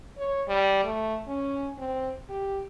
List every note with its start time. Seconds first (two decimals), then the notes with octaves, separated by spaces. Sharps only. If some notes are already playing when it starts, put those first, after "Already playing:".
0.18 C#5
0.48 G3
0.84 A3
1.28 C#4
1.78 C4
2.29 G4